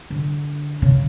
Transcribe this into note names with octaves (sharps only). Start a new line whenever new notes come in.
D3
C#3